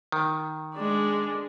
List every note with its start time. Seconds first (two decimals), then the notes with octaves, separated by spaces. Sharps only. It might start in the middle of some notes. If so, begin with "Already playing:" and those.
0.12 D#3
0.75 G#3 D4